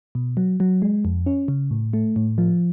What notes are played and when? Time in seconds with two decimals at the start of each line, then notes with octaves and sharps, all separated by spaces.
0.15 B2
0.37 F#3
0.60 F#3
0.82 G#3
1.05 F2
1.26 C#4
1.48 C#3
1.71 A2
1.93 A3
2.16 A2
2.38 F3